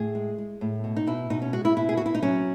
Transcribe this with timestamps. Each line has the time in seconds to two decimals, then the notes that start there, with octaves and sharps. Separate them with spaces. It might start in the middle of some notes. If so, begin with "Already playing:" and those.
Already playing: A2 G#4
0.15 G#3
0.38 G#3
0.61 A2
0.84 B2
0.96 D#4
1.07 B2 E4
1.30 B2 D#4
1.42 C#4
1.53 G#3 F#4
1.65 E4
1.77 B2 E4
1.89 G#4
1.97 B2 F#4
2.06 E4
2.15 D#4
2.22 F#3 C#4